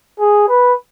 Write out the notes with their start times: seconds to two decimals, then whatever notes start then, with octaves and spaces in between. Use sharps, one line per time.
0.20 G#4
0.49 B4